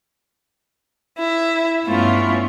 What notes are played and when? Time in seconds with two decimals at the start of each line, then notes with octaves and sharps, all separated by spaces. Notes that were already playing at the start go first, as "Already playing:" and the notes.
1.17 E4
1.87 G2 A3 B3 C#4 E4 F4